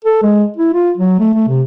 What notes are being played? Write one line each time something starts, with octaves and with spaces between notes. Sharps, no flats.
A4
G#3
E4
F4
F#3
A3
A3
C3